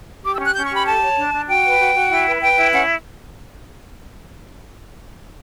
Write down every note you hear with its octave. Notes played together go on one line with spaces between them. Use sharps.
G4 D6
E6
C#4
F#6
C#4 G6
C#6
G4
B5
A4 A5
C#5
D4
D4
F#4 G5
B4
F#4
F#4
E4
B4
B4 G5
E4
C#4 F#5